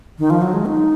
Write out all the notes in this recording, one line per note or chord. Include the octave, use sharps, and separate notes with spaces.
D#3
F3
F#3
G#3
D#4